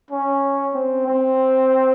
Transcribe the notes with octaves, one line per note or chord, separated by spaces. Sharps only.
C#4
C4
C4